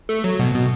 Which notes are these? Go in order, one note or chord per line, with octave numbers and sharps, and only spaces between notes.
A3
F#3
B2
B2